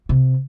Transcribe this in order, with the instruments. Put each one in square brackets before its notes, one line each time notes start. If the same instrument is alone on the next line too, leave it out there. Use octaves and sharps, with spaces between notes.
[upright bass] C3